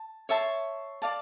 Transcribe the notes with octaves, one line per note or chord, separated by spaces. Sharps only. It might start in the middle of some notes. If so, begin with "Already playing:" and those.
Already playing: A5
C#5 E5 A5 C6
D5 F5 A5 D6